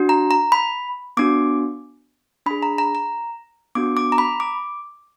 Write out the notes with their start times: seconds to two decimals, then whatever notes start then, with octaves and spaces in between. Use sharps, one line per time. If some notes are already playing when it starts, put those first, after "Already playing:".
Already playing: D4 F#4
0.09 A#5
0.31 A#5
0.52 B5
1.17 B3 D4 F#4 D6
2.46 D4 B5
2.51 G#4
2.63 A#5
2.78 A#5
2.95 A#5
3.75 B3 D4 F#4 D6
3.97 D6
4.12 A#5
4.18 B5
4.40 D6